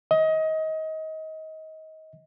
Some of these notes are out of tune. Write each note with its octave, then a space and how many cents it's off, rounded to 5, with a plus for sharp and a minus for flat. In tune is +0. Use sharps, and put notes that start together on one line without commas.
D#5 +25